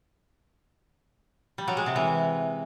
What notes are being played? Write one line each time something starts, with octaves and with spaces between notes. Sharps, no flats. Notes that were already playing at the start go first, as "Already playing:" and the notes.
G3
F#3
G#3
C3
E3